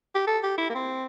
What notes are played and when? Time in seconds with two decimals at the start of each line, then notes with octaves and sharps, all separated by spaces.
0.15 G4
0.27 A4
0.43 G4
0.58 E4
0.70 A#3
0.75 C4